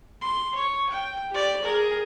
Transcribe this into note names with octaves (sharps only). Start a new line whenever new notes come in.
C6
C#5
G5
G4 D5
G#4 A#4